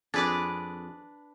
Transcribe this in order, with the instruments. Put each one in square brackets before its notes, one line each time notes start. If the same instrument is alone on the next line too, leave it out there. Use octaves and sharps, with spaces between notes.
[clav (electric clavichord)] F2 G#4 A5 [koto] D4 B4 D5